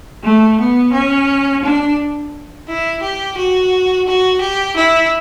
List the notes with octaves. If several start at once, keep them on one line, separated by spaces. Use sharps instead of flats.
A3
B3
C#4
D4
E4
G4
F#4
F#4
G4
E4